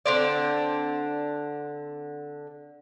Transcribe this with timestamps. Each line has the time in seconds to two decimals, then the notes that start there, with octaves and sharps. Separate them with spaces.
0.06 D3 C4 D5